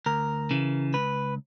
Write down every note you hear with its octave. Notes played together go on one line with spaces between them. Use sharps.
D2 A#4
C#3 E3
C#2 B4